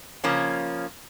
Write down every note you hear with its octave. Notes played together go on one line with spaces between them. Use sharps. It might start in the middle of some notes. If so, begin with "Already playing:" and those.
C#3 F3 A#3 C#4